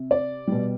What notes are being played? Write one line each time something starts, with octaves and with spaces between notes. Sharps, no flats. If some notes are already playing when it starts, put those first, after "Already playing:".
Already playing: C3
D5
B2 G3